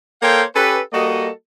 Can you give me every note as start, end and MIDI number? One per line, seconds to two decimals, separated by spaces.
0.22 0.43 58
0.22 0.43 69
0.22 0.43 72
0.22 0.43 73
0.22 0.43 77
0.22 0.43 79
0.55 0.79 61
0.55 0.79 67
0.55 0.79 69
0.55 0.79 71
0.93 1.29 55
0.93 1.29 58
0.93 1.29 66
0.93 1.29 69
0.93 1.29 75